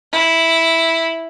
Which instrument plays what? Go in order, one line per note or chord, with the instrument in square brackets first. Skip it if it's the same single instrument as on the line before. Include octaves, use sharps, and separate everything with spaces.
[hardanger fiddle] E4